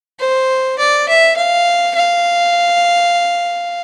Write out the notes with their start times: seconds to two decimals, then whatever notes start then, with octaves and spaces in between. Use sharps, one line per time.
0.20 C5
0.79 D5
1.09 E5
1.37 F5
1.95 F5